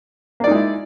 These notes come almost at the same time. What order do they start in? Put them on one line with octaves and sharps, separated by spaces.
A#3 D5 D#4 G#3 E4